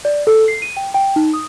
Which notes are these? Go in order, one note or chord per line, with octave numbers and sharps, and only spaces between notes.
D5
A4
C7
D#7
G5
G5
D#4
D#6